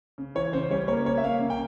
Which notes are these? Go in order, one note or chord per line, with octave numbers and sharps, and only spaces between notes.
C#3
E3 C#5
C#3 C5
G3 C#5
A#3 C#5
C#3 C#5
E5
A#3 F5
C#3
G5